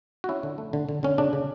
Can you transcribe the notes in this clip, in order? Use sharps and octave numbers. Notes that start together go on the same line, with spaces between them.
F#4
C#4 E4
D3
A3
D3
D3
D3 C#4
C#3 D4
C#3